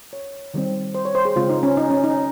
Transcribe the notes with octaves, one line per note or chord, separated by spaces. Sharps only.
C#5
D#3 G3 C4
C5
C#5
C5
G#4
C#3 G#3 C4 F4
D#4
C#4
D#4
C#4
D#4